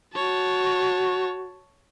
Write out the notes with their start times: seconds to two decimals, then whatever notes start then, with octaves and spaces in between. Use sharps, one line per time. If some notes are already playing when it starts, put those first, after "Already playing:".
0.14 F#4 C#5 A5